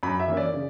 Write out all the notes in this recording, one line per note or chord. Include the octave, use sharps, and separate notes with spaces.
F#2 B5
E5
E3 A#3 C#4
D5
C#3